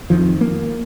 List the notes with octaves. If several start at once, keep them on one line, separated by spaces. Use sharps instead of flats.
F2 D#3 F3
A#3